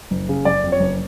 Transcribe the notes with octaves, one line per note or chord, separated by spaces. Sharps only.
F#1
C#3
F#1 D5
F2
C#5
F#1